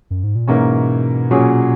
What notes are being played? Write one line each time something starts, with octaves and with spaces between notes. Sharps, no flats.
F#2
G#2
A#2
G#2 B2 E3 A#3 C#4
A#2 F#3 C#4 G#4